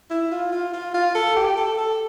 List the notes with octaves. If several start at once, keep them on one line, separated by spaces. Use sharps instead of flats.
E4
F4
F4
F4
F4
A4
G4
A4
A4